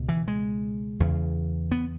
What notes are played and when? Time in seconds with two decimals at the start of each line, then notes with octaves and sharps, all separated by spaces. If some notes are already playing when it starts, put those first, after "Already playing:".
Already playing: C#2 B2
0.09 E3
0.28 G#3
1.00 E2 C#3
1.72 B3